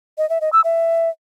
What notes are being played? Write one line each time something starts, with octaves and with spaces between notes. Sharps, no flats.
D#5
E5
D#5
E6
E5